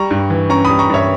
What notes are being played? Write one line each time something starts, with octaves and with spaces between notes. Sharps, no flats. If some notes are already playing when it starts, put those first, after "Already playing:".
Already playing: G3 A#5 C#6
G2
E3
C#4 A#5 C#6
G3 B5 D#6
A#5 C#6
G2 C#5 E5